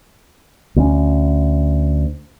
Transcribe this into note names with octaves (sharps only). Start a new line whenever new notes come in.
D2 A#3 C#4